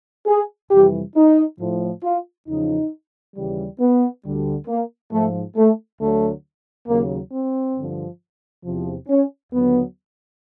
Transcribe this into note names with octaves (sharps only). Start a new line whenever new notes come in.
G#4
F2 C3 E3 G3 G4
D#4
A2 F3
F4
E2 C#3 F3 D#4
D#2 C#3 E3 G3
B3
D2 D3 G3
A#3
G#2 F3 A3
A3
D2 D3 F#3 A3
D#2 C#3 F#3 A#3
C4
G2 D3 F3
E2 C3 F3
C#4
D#2 D3 F#3 B3